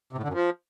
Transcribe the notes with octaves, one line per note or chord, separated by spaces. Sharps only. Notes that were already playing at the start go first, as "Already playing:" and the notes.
C3
A2
D3
F#2
F3